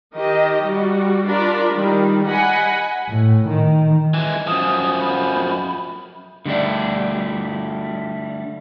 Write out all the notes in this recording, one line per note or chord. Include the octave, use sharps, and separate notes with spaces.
D#3 G4 D#5
G3 F#4
D4 F4 A#4 B5
D#3 G3
D#5 F#5 G#5 B5
A2
D#3
E3 G#3
F#2 F3 D#6
B5
D3 G3 A3 D4